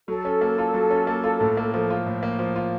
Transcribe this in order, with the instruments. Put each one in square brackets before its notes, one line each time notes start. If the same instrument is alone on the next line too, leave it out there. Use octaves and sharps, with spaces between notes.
[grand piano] F#3 [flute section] A4
[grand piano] C#4
A#3
F4
F#3
C#4
A#3
F4
A2
A#3
F3
F4
A2
A#3
F3
F4